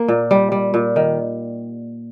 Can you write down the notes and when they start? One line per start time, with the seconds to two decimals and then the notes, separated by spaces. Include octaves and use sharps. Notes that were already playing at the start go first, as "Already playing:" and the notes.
Already playing: A#3
0.08 A#2
0.31 G3
0.52 G3
0.74 A#2
0.96 D#3